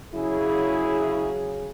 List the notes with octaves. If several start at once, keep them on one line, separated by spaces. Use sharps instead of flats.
C#3 F#3 E4 G#4